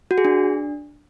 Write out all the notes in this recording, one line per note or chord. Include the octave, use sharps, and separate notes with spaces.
F#4
G#4
D4